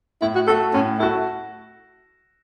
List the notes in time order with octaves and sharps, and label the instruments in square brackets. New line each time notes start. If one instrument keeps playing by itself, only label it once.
[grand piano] A2 [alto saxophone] E4
[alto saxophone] F#4
[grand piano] A3 F#4 [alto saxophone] A4
[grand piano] A2 [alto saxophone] C#4
[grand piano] A3 F#4 [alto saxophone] E4